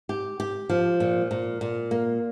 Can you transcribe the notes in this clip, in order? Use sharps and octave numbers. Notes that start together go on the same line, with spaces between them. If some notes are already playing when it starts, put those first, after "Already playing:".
G4
G4
F3
A#2
A#2
A#2
A#3